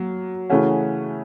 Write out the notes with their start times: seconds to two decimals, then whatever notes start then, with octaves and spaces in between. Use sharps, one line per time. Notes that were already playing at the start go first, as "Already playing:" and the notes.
Already playing: F#3 A#3
0.50 C#3 E3 A3 C#4 F#4